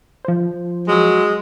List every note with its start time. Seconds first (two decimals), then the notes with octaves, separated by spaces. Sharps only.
0.25 F3 C5
0.88 F#3 G#3